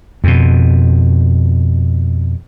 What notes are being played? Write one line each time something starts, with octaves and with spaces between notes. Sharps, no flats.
F2 B2